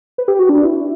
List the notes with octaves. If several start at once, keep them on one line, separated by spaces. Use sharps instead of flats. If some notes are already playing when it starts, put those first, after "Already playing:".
B4
G4
F#4
D4
E4